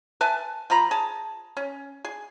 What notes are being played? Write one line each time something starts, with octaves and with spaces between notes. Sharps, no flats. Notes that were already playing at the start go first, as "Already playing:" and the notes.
B4 E5 G#5 A5
F3 F4 A#5 B5
G#4 A5
C#4
G#4